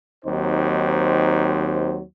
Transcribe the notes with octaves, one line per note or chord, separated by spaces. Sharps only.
D#2 F#3 C4 D#4 C5